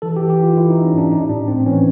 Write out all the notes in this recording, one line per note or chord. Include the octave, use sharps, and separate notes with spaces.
E3 A4
G4
E3
G4
E3 F4
E3 E4
D#4
E3
C#4
G#2 D4
A2 D#4
A2 D4
A2 C4
E3 C#4